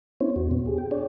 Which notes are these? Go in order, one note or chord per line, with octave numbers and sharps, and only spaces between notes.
B3 C#4 D4 E4 C5 C#5
E2 F#4
E2 A#2 B3
G4 G#4
G5
D4 G#4 C#5 D5